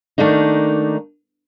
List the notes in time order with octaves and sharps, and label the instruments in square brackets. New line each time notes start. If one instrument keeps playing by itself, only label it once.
[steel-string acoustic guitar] D#3 A3 A#3 D4 D#4